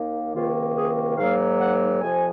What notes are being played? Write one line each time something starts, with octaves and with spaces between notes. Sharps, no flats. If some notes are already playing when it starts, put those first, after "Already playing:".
Already playing: D#2 D#3 A#3
C#2 C3 D#3 A#3 F4
G#4
G#2 D#3 F#3 A#3 F5
F#5
F2 C3 F3 G#5